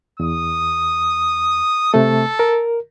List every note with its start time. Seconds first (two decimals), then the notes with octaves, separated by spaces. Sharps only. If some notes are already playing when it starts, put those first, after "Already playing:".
0.20 E2 D#6
1.94 C3 A3 A4
2.39 A#4